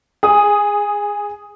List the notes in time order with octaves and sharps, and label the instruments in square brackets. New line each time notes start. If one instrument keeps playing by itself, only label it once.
[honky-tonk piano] G#4 D#6